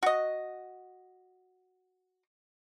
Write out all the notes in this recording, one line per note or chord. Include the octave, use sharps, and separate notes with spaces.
F#4 D#5